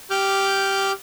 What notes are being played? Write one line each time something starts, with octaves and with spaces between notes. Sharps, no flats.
G4 D6 F6 G6